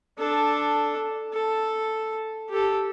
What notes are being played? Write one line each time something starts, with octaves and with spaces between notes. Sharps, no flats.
D4 A4
A4
G4 A4